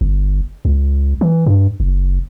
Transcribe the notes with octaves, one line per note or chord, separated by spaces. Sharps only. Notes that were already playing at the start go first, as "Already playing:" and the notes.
G1
C#2
E3
G2
F#1